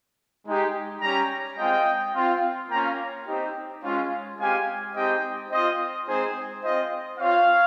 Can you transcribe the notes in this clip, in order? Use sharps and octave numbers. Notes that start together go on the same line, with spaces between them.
G#3 D#4 G4
G3 C#4 G4 G5 A#5
G#3 C4 F4 D#5 G5
C4 F4
A#3 C#4 F4 G5 A#5
C4 D#4 G4
G#3 C#4 F4
G#3 C4 G4 F5 G#5
G#3 C4 D#4 G4 D#5 G5
C4 F4 C5 D#5
G#3 C4 D#4 G#4 C5
C4 F4 C5 D#5
C4 F4 C#5 F5